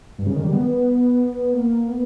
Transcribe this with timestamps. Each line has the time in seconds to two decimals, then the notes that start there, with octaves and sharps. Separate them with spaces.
0.19 G2
0.26 C#3
0.36 D#3
0.44 G3
0.53 B3
1.53 A#3
1.88 B3